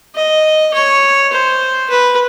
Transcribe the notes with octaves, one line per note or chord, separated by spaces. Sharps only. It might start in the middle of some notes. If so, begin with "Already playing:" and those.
D#5
C#5
C5
B4